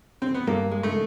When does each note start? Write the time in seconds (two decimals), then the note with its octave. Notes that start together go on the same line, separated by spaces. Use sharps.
0.22 C4
0.34 B3
0.47 G2 A#3
0.72 G#3
0.83 A3